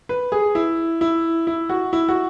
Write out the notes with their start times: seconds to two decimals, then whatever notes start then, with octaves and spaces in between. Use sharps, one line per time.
0.09 B4
0.32 G#4
0.55 E4
1.01 E4
1.47 E4
1.70 F#4
1.93 E4
2.09 F#4